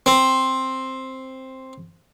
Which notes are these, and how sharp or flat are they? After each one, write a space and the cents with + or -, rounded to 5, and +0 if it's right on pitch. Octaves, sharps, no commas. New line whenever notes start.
C4 +5